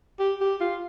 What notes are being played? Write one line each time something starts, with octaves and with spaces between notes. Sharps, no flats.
G4
G4
F4